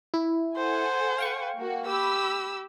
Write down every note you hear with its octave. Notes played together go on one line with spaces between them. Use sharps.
E4
A4 C5 F#5 G#5
F5 G5 C#6
A#3 F#4
G4 B5 E6